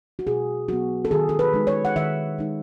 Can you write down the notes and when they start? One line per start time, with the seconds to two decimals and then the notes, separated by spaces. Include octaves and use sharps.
0.19 F#4
0.27 B2 G#4
0.69 F#3 B3 F#4
1.05 A4
1.11 D#3 G#4
1.29 A4
1.39 B4
1.54 G#3 D#4
1.67 C#5
1.85 F#5
1.96 D#3 E5
2.38 G#3 D#4